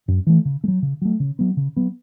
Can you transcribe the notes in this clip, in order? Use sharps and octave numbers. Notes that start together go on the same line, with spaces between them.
F#2
E3 A3
C#3
A3
F#3
C#3
F#3 A3
C#3
F#3 B3
C#3
F#3 B3